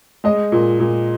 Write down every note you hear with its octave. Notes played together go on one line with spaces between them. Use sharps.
G#3 D#5
A#2
A#2